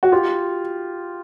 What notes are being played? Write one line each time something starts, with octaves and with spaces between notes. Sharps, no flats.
F#4
F4 G4